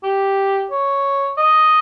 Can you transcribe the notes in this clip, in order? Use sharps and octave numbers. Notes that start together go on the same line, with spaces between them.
G4
C#5
D#5